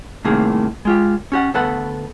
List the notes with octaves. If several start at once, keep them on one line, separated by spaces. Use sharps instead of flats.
C2 A2 C3 D#3 A#3 G#4
G#3 F4 G4
C#4 G4 F#5
D2 B3 A4 B4 F#5